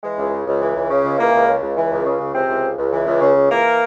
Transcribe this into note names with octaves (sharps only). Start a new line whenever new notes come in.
E3 G#3
C#2
C#3
C#2
E3
C#2
C#3
C#2
E3 A#3
C#2
C#3
C#2
E3
C#2
C#3
C#2
C3 E3 C4
C#2
C#3
C#2
E3
C#2
C#3
C#2
E3 A#3 A#4